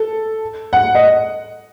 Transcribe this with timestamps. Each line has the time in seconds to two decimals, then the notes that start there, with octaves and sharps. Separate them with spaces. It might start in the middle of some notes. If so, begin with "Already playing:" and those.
Already playing: A4
0.73 F#5
0.95 D#5